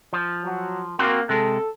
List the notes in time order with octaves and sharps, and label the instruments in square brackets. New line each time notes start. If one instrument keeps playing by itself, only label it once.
[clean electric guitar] F3
[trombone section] F#3
[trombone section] A#3 [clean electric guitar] C4 F#4 C6
[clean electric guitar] C3 G#3 [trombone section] A4